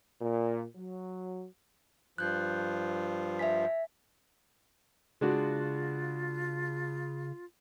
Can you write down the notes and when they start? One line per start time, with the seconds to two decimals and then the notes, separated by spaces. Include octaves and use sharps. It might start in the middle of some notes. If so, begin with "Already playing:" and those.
0.21 A#2
0.76 F#3
2.18 G2 F3 F#6 G6
3.39 E5 G#5 B6
5.21 C#3 G#3 D4 F4 F#4